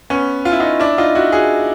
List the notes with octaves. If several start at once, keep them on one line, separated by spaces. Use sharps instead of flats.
B3 C#4
F4
E4
D#4 F4
D4 E4
D#4 F4
E4 F#4
F#4 G#4